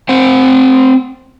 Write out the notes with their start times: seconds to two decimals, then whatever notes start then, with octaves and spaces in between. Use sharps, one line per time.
0.09 C4 C5 F#5